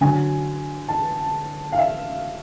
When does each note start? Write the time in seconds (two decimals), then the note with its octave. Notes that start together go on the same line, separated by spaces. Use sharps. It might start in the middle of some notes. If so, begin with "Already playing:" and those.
0.01 D3 F#3 G#5
0.89 A5
1.72 F5
1.78 E5